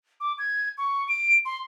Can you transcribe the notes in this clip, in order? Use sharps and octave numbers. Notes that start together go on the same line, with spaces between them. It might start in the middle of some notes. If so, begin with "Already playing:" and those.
D6
G#6
C#6
D7
C6